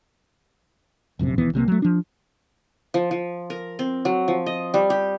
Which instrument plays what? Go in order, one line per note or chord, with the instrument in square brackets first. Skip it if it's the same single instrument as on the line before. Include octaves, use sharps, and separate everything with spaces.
[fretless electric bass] F1 A#1 F#2 C3
E1 D#2 E3 B3
B1 C3 G3 A#3
F#3 A3
F3 D4
[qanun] F3
F3
A#4
C4
F#3
F3
D#5
G3
G4